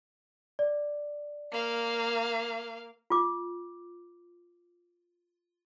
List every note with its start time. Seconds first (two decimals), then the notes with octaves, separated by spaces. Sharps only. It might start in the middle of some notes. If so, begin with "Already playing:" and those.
0.59 D5
1.52 A#3 F5
3.10 F4 D6